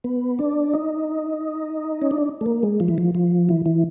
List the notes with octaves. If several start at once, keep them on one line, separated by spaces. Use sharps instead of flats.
B3
D4
D#4
C#4
D4
A3
A#3
G#3
F3
E3
F3
F3
E3
E3